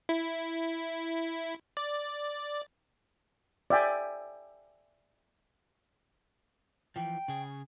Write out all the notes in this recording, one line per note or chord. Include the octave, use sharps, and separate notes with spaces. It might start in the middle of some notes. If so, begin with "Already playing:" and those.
E4
D5
D5 E5 G5 G#5
E3 F3 G5
C#3 G#4